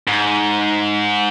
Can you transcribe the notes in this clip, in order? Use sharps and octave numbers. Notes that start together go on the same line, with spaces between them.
G#2